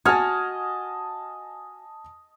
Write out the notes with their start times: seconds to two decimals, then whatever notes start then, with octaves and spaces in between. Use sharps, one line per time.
0.05 F#4 D#5 G#5 A5 F6 G#6